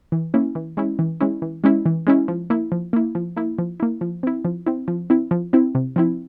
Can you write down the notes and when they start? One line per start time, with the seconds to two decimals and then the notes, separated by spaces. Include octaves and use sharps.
0.12 E3
0.34 A#3 C#4 E4
0.55 E3
0.77 G#3 C#4 E4
0.99 E3
1.20 G#3 C#4 E4
1.42 E3
1.64 G#3 C#4 E4
1.86 E3
2.07 G#3 C#4 E4
2.28 F3
2.50 A#3 E4
2.72 F3
2.93 A#3 E4
3.15 F3
3.37 A#3 E4
3.59 F3
3.80 A#3 E4
4.01 F3
4.23 C4 E4
4.45 F3
4.66 C4 E4
4.88 F3
5.10 C4 E4
5.31 F3
5.53 C4 E4
5.75 C3
5.96 F3 C4 E4